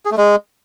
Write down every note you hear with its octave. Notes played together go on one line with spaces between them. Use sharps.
G#4
A3
G#3